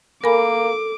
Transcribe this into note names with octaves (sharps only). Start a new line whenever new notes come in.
A#3 A4 A#4 G#5 B5 D6